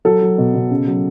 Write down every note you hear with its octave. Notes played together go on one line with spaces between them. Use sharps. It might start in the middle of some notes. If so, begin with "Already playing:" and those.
F#3 A4
F#3
B2
B2
C#3
F#3